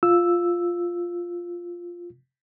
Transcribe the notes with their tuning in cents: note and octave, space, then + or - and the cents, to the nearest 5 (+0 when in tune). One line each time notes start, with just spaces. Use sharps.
F4 +0 E6 +0